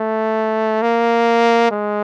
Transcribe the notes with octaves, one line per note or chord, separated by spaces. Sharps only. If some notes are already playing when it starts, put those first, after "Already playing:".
Already playing: A3
A#3
G#3